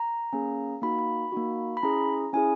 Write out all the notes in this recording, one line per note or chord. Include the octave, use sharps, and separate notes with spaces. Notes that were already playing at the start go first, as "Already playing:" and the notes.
Already playing: A#5
A#3 C#4 G#4
A#3 D#4 F#4 B5
B5
A#3 D#4 F#4
B5
C#4 E4 G#4 A#5
C#4 E4 G#4 G#5